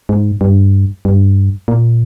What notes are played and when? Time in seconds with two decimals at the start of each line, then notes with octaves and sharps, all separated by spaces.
0.09 G#2
0.41 G2
1.05 G2
1.68 A#2